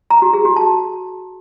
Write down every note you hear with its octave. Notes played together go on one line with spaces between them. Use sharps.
A#5
F#4
G#4
F#4
A5